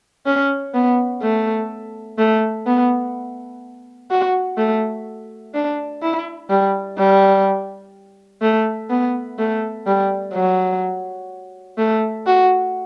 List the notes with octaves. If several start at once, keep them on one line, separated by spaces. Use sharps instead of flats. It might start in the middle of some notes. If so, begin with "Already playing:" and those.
C#4
B3
A3
A3
B3
F#4
A3
D4
E4
G3
G3
A3
B3
A3
G3
F#3
A3
F#4